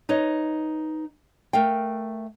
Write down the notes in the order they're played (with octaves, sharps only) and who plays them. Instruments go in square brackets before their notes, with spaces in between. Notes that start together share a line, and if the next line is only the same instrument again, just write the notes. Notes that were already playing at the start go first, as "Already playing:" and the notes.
[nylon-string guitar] D#4 B4 C#5 D#5
A3 A#4 F5 G5